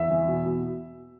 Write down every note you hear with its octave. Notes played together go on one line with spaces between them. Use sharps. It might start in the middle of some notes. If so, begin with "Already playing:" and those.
Already playing: E2 E5
E3
B2
B2